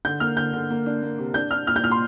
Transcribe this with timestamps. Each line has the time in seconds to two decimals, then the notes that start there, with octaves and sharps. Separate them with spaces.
0.05 D3 G6
0.20 A#3 F6
0.36 D3 G6
0.53 D3
0.70 A#3
0.86 D4
1.03 A#3
1.18 C3
1.34 D4 G6
1.51 D4 F6
1.67 A#2 F6
1.76 G6
1.83 A#2 F6
1.91 C6